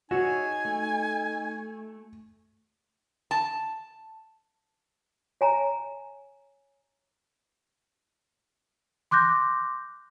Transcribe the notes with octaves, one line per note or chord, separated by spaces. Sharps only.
D#4 F#4 G#4 C#5 E5 G#5
A3
A5
C#5 G#5 A#5
C6 D6 F#6 G6 A#6